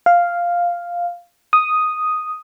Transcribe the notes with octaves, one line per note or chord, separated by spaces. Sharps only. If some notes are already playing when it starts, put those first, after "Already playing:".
F5
D#6